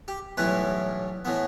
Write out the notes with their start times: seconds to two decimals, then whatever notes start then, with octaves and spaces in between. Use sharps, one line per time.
0.08 G4
0.37 B1 A2 E3 G3 B4
1.25 A2 E3 B3